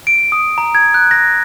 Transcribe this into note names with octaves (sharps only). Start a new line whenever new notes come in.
D7
D#6
A#5
G#6
F#6
A#6